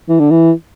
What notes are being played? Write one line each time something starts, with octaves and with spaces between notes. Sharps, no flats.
E3
D3
E3